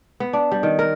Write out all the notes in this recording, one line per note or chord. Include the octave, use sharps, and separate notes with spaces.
B3
D4
G3
D#3
A#4